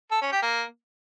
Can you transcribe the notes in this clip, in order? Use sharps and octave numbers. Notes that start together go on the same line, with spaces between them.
A4
C#4
G4
A#3